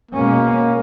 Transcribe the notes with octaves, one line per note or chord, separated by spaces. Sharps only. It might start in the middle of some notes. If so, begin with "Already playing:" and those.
B2 G#3 A#3 C#4